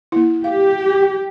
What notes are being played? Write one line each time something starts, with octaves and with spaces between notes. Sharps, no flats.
A#3 E4
G4 F5